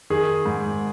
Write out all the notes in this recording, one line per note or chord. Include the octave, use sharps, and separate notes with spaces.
D#3 G#4
G#2